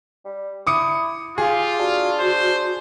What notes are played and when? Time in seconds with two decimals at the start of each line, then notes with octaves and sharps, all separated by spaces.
0.25 G3
0.67 E4 D6 D#6 C#7
1.38 F4 G4 G#4 F5
1.79 D4 F#4
2.20 C5